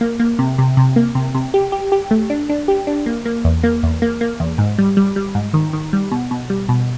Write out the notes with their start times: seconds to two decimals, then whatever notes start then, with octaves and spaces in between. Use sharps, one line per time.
0.01 A#3
0.20 A#3
0.39 C3
0.58 C3
0.77 C3
0.96 A#3
1.15 C3
1.35 C3
1.54 G4
1.72 G4
1.92 G4
2.11 A3
2.30 D4
2.49 D4
2.68 G4
2.87 D4
3.06 A#3
3.25 A#3
3.45 E2
3.63 A#3
3.83 E2
4.02 A#3
4.21 A#3
4.40 E2
4.58 G#2
4.78 G3
4.97 G3
5.16 G3
5.35 G#2
5.54 D#3
5.73 D#3
5.93 G3
6.11 B2
6.31 B2
6.50 G3
6.69 B2